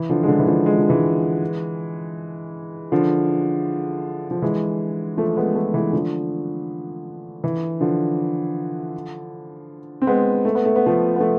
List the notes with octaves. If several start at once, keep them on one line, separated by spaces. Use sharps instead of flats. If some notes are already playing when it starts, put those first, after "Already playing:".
Already playing: E3
D3 F3
G#3
D3 F3
E3
D3 F3
G#3
F3
E3 G#3
D3 F3
F3
E3 G#3
F3 A3
G#3 B3
F3 A3
E3 G#3
D3 F3
E3
D3 F3
C4
G#3 B3
A3
B3
A3
B3
F3 A3
B3
F3 A3